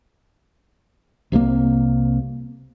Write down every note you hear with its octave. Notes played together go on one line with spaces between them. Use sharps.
C2 C3 E3 A#3